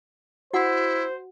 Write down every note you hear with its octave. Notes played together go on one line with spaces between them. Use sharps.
E4 F#4 C5 F#5